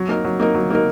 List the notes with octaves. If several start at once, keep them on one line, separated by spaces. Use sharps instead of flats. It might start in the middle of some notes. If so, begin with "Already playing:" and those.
Already playing: F#3
A#3 D#4 A#4
F#3
A#3 D#4 A#4
F#3
A#3 D#4 A#4